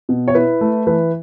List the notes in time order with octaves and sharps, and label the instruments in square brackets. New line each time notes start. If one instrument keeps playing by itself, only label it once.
[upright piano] B2
C#5
E4 B4
A3
E3 B4